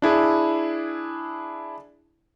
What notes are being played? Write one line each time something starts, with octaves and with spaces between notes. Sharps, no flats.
D4 E4 G#4